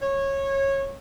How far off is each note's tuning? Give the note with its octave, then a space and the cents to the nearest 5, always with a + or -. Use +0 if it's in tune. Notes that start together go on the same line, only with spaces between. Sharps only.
C#5 -20